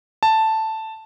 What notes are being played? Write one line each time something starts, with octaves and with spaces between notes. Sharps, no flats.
A5